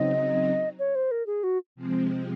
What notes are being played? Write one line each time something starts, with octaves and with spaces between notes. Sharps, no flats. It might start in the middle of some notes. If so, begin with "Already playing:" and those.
Already playing: C#3 F#3 C4 D#4 D#5
C#5
C5
A#4
G#4
F#4
C3 F3 G#3 C4